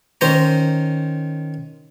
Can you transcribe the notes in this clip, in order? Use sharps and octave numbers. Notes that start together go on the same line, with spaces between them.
D#3 C#4 C5 A#5